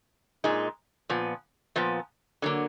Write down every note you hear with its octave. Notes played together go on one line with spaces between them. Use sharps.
A#2 G#3 D#4
A#2 F3 B3
A#2 F3 B3
D3 F#3 A#3